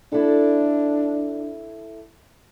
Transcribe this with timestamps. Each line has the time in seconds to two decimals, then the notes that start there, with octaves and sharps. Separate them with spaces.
0.12 D4 E4 A4